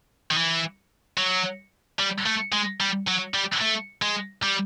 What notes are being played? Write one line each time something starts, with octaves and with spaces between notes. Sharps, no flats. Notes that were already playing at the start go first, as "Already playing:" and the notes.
D#3
E3
F#3
G3
A3
G#3
G3
F#3
G3
A3
G#3
G3